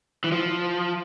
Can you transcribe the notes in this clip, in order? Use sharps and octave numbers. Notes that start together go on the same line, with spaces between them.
E3
F3